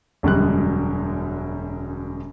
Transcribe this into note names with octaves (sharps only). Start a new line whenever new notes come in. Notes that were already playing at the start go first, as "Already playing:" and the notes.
E1 F#2 D3 G3 G#3 F#6